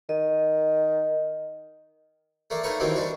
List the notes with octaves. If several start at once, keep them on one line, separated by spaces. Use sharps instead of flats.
D#3 D#5
A3 A#3 D5
A3 A#3 D#4 B4 C#5
D#3 E3 F#3 G3 A#3 C4
G3 D4 F#4